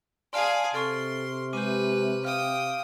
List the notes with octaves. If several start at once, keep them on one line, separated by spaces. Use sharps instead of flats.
G#4 D5 F5 G#5 A5 C6 F6 D7
C3 A4 C6 C#6 F6 D7
G#3 G4 B4 D6 D#7
F5 G5 D#6 F6 D7